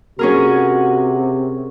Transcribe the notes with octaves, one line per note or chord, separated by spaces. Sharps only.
C3 C#4 F#4 G#4 A#4